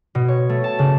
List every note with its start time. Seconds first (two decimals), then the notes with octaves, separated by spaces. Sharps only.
0.15 B2
0.28 C#5
0.49 A3
0.64 A5
0.79 C#3